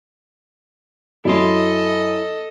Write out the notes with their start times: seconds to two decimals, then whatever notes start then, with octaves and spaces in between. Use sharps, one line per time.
1.25 F#2 E4 A4 D#5 C6